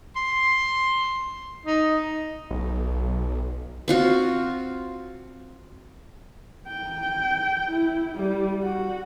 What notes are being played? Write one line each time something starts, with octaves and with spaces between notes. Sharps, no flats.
C6
D#4
B1
C4 F4 F#4
G5
E4
G3
F#4